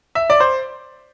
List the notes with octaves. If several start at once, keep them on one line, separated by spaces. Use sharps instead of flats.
E5
D5
C5